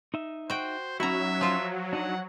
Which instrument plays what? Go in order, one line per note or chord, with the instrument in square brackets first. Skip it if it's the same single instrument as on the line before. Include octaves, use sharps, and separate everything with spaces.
[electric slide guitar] D#4 E5
[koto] F#4 G5 [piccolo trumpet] C5
[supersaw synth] F#3 [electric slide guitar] C#4 D#4 F#4 [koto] E4 A#5 [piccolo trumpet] E5
[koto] F3 F4
[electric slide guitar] D4 D#4 [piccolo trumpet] F#5